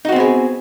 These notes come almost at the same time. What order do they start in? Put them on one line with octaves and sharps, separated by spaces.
D#4 F#4 C4 B3 G#4